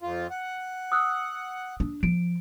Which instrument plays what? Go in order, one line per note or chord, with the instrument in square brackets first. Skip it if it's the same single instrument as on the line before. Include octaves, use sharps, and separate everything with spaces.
[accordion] F2 F4
F#5
[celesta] D#6 E6 F#6
[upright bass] D4
[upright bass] F3 [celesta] D7